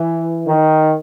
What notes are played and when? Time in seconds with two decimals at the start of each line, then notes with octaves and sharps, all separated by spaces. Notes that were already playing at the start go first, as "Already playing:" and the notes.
Already playing: E3
0.46 D#3